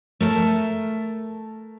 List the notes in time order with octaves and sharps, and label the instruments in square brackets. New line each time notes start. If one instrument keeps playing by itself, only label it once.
[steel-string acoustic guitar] A3 A#4 A5